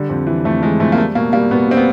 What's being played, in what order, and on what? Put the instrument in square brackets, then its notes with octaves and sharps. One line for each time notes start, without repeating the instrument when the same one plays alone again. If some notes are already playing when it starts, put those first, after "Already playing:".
Already playing: [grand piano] D3 G3
F2
E3
F2 A3
E3 G#3
F2 A3
A#3
G3 A3
B2 A#3
G3 A#3
B2 B3
G3 C4
B3